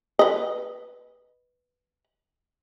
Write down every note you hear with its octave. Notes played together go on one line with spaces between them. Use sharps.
B4 D#5